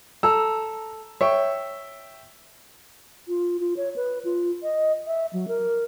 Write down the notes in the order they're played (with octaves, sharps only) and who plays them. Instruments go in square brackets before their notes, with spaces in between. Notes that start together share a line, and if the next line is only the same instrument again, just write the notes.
[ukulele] A4 [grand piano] A#5 E6
[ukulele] C#5 [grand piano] E5 G5
[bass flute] F4
F4
C#5
B4
F4
D#5
E5
F#3
A#4